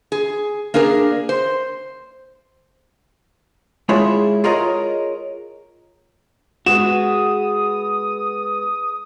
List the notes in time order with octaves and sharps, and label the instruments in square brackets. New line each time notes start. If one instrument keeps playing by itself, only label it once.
[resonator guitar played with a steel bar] G#4
A#3 D4 G#4 A#4
C5
[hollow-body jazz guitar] G#3 E4 F4 G#4 C#5 E5
F4 G#4 A#4 C#5 D#5
[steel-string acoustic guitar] G#3 B3 [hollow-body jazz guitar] F#4 [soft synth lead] D#6 [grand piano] E7